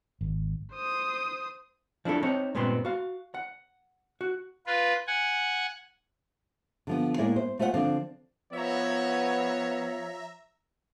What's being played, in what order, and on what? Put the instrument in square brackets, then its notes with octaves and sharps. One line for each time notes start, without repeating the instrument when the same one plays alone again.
[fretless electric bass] G#1
[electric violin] C5 D#6
[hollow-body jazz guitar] F3 D4 E4 A4
C4 D#4 C#5
G2 A#2 G#3 B3 C4 C6
F#4 F5
F#5
F#4
[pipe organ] F4 B4
F#5 G#5
[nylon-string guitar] D3 F3 B3
A2 G#3 A#3 E4 G#4 D5
C5
A3 F4 C5 F5 F#5
D3 F3 C4 D4 F5
[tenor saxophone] F3 [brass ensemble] B3 [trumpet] C#5 [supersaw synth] E5 A#5